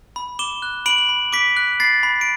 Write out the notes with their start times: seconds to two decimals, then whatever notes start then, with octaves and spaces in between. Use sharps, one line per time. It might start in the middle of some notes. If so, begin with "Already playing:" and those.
0.16 B5
0.39 D6 E7 G7
0.62 F#6
0.86 B5 D7 F#7
1.09 B5
1.33 D6 B6 D7
1.57 F#6
1.80 B5 A6 C7
2.03 B5
2.21 D7